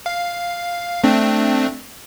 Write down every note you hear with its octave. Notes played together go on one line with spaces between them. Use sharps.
F5
A3 C4 D4